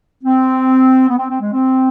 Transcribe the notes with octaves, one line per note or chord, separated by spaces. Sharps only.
C4
B3
C4
C4
G#3
C4